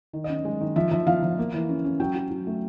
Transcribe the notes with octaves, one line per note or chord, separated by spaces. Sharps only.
D#3
C#4 D#5
G#3
D#3
F3 E5
F3 E5
F3 F5
F3
A#3
E3
C#4
C#4
F#3 G5
F#3
F#3
A3